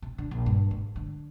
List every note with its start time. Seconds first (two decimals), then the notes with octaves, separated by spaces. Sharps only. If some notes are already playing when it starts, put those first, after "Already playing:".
0.02 C3
0.18 D3
0.31 A#1
0.46 G2
0.71 G#2
0.96 D3